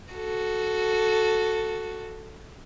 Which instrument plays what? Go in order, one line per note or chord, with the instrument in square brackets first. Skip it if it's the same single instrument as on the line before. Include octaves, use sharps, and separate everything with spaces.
[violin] F#4 A4